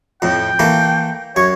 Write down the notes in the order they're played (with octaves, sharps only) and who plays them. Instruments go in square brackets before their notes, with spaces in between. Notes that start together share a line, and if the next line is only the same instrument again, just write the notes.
[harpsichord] F2 A2 [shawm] G5
[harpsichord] E3 A3 A#3
[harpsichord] F#2 C#6 [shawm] C#5